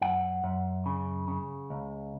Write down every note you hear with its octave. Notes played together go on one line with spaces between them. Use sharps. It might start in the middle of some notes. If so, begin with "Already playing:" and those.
F#2 F#5
F#2
C#3
C#3
C#2